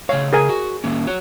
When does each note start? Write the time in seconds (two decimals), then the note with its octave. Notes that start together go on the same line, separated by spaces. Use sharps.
0.09 C#3 A3 C#5 F5
0.33 G#4 A#4 G#5
0.49 F#4
0.84 D#3 A#3 C#4
1.07 F#4 C#5